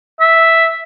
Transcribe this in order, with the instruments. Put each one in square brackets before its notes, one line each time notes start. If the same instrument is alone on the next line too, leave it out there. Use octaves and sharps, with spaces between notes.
[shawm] E5